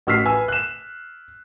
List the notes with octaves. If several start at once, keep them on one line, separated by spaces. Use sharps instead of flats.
A1 F#4 E6 F6 B6 C7
B4 G#5 E6
F#6 E7